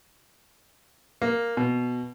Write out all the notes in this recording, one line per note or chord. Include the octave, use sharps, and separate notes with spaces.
A#3
B2